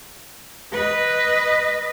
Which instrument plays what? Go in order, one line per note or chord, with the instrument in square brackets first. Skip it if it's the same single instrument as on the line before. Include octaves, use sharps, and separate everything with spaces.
[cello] B4 D#5